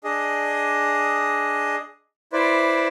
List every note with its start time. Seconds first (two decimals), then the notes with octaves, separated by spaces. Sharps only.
0.04 D4 G#4 D#5
2.33 E4 B4 C5 D5